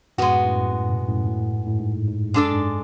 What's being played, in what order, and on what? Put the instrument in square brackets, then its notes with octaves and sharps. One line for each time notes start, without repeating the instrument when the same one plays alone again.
[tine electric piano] F#2 A2 [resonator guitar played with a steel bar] G#3 B3 F#4
[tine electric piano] F#2 A2
F#2 A2
G#2 B2
F#2 A2
F#2 A2
F#2
G#2
F#2 A2
G#2
G#2
[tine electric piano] F#2 [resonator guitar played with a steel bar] G#3 D4 A4 D5
[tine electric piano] G#2